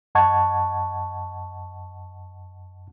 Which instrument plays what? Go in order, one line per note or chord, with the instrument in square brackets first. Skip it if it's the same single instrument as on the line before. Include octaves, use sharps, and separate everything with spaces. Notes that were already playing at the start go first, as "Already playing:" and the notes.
[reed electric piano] F#2 D#5 F#5 A5 C#6 G#6